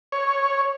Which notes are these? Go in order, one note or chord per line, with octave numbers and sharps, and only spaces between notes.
C#5